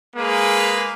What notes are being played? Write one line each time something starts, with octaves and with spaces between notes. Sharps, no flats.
G#3 A#3 G#4 B4